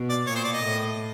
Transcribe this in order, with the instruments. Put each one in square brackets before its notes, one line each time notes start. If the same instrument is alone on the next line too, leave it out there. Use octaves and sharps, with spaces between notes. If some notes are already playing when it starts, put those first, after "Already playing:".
Already playing: [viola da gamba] B2
[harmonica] D5
[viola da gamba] A#2 [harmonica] C#5
[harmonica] C5
D5
D#5
[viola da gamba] A2